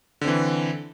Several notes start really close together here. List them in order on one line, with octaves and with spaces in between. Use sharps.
D3 C4 E3